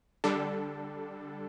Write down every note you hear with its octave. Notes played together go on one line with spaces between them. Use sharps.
D3 G3 D4 A4